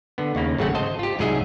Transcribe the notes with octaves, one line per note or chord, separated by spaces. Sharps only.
D3 B3
D#2 C#3 A#3
G#1 C#3 F#3 A3 C4 F#5
C5 D#5 A5
F4 G4
C2 G#2 F#3 G#4 D#5 E5